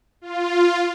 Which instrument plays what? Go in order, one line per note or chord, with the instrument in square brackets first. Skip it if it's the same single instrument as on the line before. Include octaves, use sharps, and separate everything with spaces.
[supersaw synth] F4